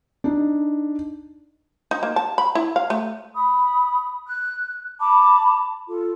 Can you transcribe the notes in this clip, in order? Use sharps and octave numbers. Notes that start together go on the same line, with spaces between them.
D4 D#4
D#4
A#3
A5
B5
E4
F5
A3
B5 D#6
F#6
A5 B5 D6
F4 A4